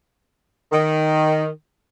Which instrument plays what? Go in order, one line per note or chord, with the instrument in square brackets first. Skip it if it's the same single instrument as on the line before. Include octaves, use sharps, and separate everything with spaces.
[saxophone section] D#3